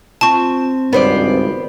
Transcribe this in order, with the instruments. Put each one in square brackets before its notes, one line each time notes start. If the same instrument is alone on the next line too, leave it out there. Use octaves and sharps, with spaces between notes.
[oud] C4 F4 [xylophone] A5 C#6
[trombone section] G#1 C#2 G2 [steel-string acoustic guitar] B3 C5 D5